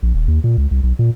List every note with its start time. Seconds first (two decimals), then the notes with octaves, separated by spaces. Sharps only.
0.03 A#1
0.14 D#1
0.28 D#2
0.44 A#2
0.58 C#2
0.71 C2
0.83 B1
0.99 A#2